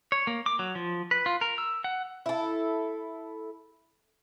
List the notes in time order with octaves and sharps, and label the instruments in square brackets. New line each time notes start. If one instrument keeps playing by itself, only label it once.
[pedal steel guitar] C#5
A#3
D6
F#3
F3
B4
F4
A#4
E6
F#5
[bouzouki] E4 A4